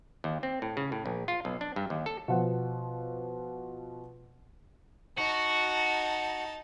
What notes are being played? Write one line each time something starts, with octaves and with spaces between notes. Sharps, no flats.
D#2
C4
A2
C#3
A2
A#1
F4
B1
D4
G2
D#2
A4
B2 F3 F#5
D#4 F#4 A5